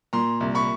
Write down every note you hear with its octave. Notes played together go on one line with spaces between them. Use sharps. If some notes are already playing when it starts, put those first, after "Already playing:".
A#2 A#5 C6
C2
B5 C#6